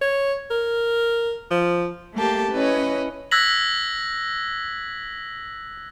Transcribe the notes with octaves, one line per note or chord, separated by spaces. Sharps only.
C#5
A#4
F3
A3 A#3 G4 A5
C#4 E4 B4 C#5 D#5
E6 F#6 G#6 A#6 B6 F#7